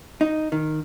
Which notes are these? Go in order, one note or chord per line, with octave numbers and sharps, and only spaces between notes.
D#4
D#3